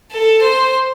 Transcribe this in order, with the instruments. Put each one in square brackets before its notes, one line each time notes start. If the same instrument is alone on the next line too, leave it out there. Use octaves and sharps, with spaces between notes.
[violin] A4
C5